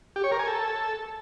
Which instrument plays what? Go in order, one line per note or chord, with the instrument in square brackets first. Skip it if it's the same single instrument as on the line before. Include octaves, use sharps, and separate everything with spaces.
[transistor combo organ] G4
C#5
A#4
G#5
A4